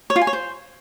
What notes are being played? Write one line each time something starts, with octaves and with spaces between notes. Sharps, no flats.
C#5
F4
G#5
C#5
C5